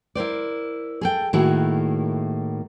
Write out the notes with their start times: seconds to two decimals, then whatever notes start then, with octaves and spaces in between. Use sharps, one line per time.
0.15 E4 A#4 C5 D5
1.01 G#4 A4 G5
1.33 A2 D#3 A#3 E4 F#4 G#4